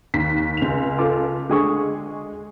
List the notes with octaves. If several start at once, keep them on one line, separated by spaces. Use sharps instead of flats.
D#2 B6
C#2 F7
F4 A4 D6
D3 G#3 G#4 C#6